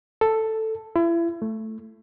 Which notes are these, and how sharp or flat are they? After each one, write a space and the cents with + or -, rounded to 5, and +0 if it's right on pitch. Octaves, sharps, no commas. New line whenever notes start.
A4 +5
E4 +35
A3 +0